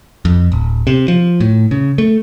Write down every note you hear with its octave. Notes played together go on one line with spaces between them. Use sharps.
F2
D1
C3
F3
A2
C#3
A3